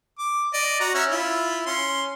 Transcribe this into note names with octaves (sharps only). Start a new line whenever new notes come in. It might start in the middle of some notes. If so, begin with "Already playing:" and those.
D6
D5 D#5
F#4 A#5
C#4 C#5 E5
E4 F4
C#4 C6